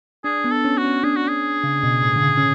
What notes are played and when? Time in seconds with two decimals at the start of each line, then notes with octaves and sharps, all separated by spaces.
0.24 D4 G#4
0.44 B3
0.51 A4
0.65 C#4
0.77 F#4
0.85 C#4
1.04 D4 G#4
1.16 F#4
1.24 C#4 G#4
1.64 C#3
1.78 C#3
1.83 B2
2.03 A2
2.16 D3
2.23 C#3
2.37 C#4